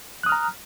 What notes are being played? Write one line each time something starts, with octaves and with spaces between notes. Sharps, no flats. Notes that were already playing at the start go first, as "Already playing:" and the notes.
A#5 D#6 F6 F#6